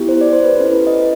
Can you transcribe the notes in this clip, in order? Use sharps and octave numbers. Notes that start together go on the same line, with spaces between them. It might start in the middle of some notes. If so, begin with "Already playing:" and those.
Already playing: B3 E4 G4
C5
D5
C5
B4
C#4 E4 A4 B4
B4
D#5